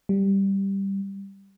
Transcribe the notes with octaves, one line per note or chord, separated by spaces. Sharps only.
G3